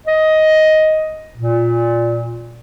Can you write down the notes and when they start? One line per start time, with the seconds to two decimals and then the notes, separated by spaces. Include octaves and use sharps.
0.07 D#5
1.37 A#2